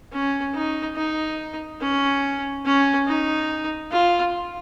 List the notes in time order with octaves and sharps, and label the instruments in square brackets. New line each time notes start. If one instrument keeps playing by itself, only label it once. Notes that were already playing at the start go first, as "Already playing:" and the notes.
[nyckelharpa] C#4
D#4
D#4
C#4
C#4
D#4
F4